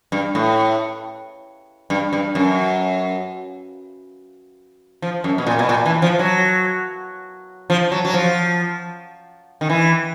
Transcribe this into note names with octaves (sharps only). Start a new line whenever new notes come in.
G2
A2
G2
G2
F#2
F3
F#2
B2
A#2
B2
A#2
E3
F3
F#3
F3
F#3
F#3
F3
D#3
E3